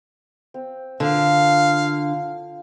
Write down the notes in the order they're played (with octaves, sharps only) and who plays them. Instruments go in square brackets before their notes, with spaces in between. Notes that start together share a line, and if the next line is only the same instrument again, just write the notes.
[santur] C4
[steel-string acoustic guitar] D3 [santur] F4 A#4 [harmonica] F5